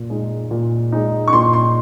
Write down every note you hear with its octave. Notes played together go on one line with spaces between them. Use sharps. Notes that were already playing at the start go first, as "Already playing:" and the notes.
Already playing: A#2
G#3 D#4
A#2
G#3 D#4
C#6
A#2 C6
C6